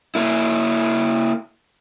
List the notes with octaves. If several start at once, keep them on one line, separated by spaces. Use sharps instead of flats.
A#3 E4